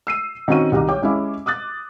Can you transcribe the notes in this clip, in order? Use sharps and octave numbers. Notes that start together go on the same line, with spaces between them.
E6 C7 D#7
D#3 C4 C#4 F#4 C#6 D#7
C2 D#3 A#5 D6
C#5 G5 D6
G#3 C#4 E4
D6 D#6 F#6 A6